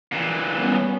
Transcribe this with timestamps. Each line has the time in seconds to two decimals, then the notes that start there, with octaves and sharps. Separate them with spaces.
0.12 A#2 E3
0.58 G3 B3 C#4